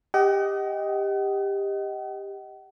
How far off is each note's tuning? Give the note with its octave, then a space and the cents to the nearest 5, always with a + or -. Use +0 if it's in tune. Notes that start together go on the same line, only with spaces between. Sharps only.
G4 +15 D#5 +10 F#5 +45